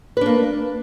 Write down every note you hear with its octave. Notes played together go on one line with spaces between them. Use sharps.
A#3 D4 B4